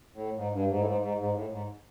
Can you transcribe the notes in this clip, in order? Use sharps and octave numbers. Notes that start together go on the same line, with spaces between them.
A2
G#2
G2
G#2
A2
G#2
G#2
G#2
A2
G#2